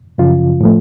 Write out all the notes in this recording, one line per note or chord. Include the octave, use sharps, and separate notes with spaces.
F#2 C#3 F3 F4
A2 F3 A3